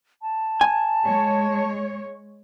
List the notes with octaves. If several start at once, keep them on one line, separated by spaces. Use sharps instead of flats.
A5
G#5
G#3 C#5